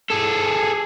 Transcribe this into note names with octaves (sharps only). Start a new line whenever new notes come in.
G#4 A4